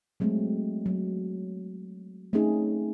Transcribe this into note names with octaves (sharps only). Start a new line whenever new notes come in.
F#3 G#3 A3 C4
F#3
A3 C4 C#4 D#4 G#4